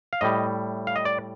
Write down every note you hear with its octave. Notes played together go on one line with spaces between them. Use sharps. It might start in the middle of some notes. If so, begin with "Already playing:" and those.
F5
A2 G3 D#5
F5
D#5
D5